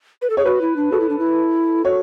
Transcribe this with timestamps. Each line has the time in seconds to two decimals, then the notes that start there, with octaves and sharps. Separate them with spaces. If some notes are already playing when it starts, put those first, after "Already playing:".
0.22 B4
0.30 A4
0.37 G#4 C#5
0.45 F#4 B4
0.61 E4
0.76 D4
0.92 F#4 A4
1.00 E4
1.09 D4
1.19 E4
1.85 F#4 C#5